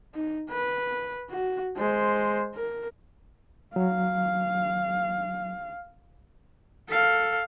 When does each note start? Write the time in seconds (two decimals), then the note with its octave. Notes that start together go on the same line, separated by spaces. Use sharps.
0.15 D#4
0.50 B4
1.31 F#4
1.77 G#3 C5
2.55 A#4
3.76 F#3 F5
6.88 A4 F5